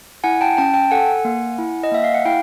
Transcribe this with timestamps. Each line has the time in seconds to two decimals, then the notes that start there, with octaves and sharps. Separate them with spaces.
0.24 E4 F#5 G#5
0.41 G5 A5
0.57 C#4 G5 A5
0.74 G5 A5
0.91 A4 F#5 G#5
1.25 A#3
1.58 E4
1.83 D#5
1.91 A#3 E5
2.04 F5
2.14 F#5
2.25 E4 F5 G5